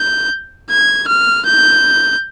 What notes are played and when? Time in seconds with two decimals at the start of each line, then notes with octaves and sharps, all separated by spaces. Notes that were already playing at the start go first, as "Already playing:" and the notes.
Already playing: G6
0.70 G#6
1.08 F6
1.46 G6